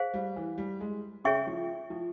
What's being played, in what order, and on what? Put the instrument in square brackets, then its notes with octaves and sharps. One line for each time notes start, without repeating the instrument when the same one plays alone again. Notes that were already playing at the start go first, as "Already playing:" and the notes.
Already playing: [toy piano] G#4 C5 F5
[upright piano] G3
E3
G3
G#3
[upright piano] C#3 [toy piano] G#4 C#5 E5 G5 C#6
[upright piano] F3
F3